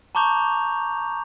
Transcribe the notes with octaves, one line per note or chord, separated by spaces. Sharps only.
A5 A#5 C#6 D6 G6 F7